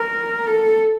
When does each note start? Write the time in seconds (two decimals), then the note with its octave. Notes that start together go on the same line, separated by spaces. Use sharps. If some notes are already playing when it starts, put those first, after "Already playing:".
Already playing: A#4
0.47 A4